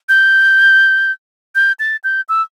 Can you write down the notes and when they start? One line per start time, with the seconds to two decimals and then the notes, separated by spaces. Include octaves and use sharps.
0.09 G6
1.55 G6
1.80 A6
2.04 G6
2.29 E6